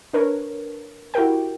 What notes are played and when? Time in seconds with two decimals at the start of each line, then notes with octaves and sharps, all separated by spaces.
0.13 D4 A#4 B4 C#5
1.14 E4 F#4 G4 A#4 G5